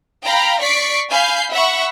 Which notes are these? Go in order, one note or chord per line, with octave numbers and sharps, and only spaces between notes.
F5 G5 A#5 B5
D5 C#6 B6 C7 D7
F5 G#5 B5 G6 C7
E5 F#5 B5 C#6